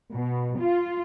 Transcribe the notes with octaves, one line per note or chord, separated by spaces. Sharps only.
B2
F4